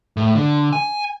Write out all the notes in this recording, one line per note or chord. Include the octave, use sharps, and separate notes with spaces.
A2
D3
G#5